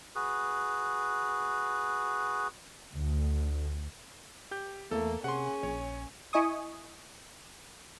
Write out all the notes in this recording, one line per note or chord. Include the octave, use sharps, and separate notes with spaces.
F#4 G#4 B4
D2
G4 G6
E2 A3 A#3 A4
C3 C#4 G#4 F#5 C6
A#1 C#5
E4 D#5 G#5 C#6 D#6